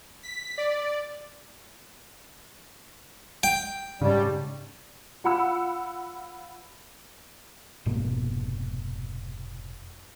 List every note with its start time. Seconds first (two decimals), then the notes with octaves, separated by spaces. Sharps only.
0.23 B6
0.58 D5
3.43 G5
4.01 G#2 C#3 G3 C#4 A5
5.24 F4 F#5 B5 E6
7.86 F1 G#2 B2 A#3